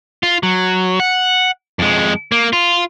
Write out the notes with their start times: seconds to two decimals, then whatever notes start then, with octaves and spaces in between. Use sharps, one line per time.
0.23 F4
0.43 F#3
1.00 F#5
1.79 F2 G#3
2.32 A#3
2.53 F4